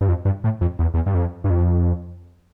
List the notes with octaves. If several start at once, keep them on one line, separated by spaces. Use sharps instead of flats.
G2
F2
G2
A2
F2
E2
E2
G2
F2
G2
F2